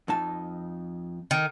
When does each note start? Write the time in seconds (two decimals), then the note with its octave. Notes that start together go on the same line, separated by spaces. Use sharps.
0.08 F2 D#4 A5
1.31 D#3